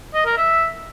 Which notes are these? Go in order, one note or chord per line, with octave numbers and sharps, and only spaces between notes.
D#5
A#4
E5